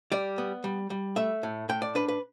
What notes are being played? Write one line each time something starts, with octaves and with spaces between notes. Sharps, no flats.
G3 D5
B3
G3
G3
A3 E5
A2
A2 G5
D5
D4 B4
B4